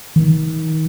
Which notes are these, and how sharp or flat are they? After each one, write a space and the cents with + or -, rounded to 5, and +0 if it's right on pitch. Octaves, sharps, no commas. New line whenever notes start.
D#3 +30